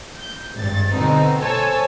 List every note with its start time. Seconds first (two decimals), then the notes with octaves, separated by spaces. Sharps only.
0.17 G6
0.54 G#1 G2 A6
0.92 B2 D3 C4 D#4
1.39 A4 C5 C#5 G#5 A5 E6